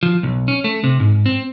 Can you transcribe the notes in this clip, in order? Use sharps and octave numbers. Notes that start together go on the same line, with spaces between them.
F3
B1
C#4
A3
C3
G#2
C4